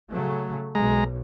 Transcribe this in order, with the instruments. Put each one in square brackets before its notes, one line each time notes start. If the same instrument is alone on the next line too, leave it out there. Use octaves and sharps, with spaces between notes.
[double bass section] C#3 F#3 A3
[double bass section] B1 [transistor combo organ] G#3 A#5